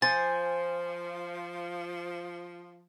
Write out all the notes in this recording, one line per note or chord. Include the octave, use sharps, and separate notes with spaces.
F3 C5 G#5 A6